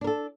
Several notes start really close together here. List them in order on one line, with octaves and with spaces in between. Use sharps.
D4 A#4 A4